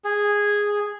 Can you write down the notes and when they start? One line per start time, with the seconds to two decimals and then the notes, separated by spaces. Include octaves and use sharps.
0.04 G#4